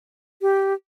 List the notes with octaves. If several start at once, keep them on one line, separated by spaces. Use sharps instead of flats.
G4